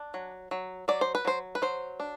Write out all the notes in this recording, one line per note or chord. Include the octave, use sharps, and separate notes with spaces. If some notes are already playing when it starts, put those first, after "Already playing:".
Already playing: D4
F#3
F#3
F#3 D5
C5
B4
F#3 C5
B4
F#3 C5
D4